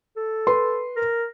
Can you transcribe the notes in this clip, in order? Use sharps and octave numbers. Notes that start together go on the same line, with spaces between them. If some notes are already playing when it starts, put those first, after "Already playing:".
A4
B4 C6
A#4